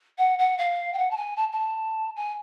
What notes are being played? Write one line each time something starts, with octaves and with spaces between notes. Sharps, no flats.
F#5
F#5
F5
G5
F#5
A5
G#5
A5
A5
G#5